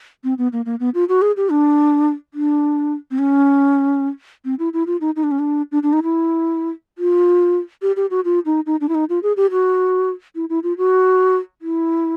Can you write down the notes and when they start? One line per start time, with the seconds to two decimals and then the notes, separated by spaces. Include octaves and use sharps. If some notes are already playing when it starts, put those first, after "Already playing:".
0.24 C4
0.38 B3
0.53 A#3
0.66 A#3
0.80 B3
0.94 F4
1.09 F#4
1.22 G#4
1.37 G4
1.50 D4
2.34 D4
3.11 C4
3.19 C#4
4.45 C4
4.59 E4
4.73 E4
4.87 F4
5.01 D#4
5.16 D#4
5.23 D4
5.31 C#4
5.39 D4
5.72 D4
5.83 D4
5.93 D#4
6.03 E4
6.98 F4
7.82 G4
7.96 G4
8.11 F#4
8.25 F4
8.46 D#4
8.66 D#4
8.81 D4
8.89 E4
8.95 D#4
9.09 F4
9.23 G#4
9.37 G4
9.51 F#4
10.35 E4
10.50 E4
10.63 F4
10.78 F#4
11.62 E4